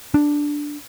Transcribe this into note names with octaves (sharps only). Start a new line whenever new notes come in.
D4